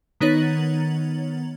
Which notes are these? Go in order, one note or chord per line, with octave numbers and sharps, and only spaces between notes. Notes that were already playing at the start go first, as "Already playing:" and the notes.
D#3 B3 D#4 C#5 A6 F#7